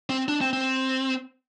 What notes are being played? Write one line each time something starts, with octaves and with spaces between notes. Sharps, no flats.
C4
D4
C4
C4